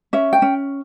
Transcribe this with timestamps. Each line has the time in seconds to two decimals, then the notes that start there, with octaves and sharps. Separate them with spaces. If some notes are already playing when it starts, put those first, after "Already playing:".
0.13 C#4 E5
0.33 G5
0.42 C#4